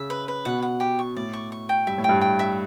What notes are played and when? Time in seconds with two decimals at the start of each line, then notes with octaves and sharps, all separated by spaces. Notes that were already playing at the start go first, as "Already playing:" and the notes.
Already playing: C#3 E5
0.10 B4
0.28 B4
0.45 B2 F#5
0.62 F#5
0.80 G4
0.99 C#6
1.16 A2 D5
1.33 C#6
1.52 C#6
1.69 G5
1.87 G2 E5
1.98 A2
2.04 G2 G5
2.21 G5
2.39 E5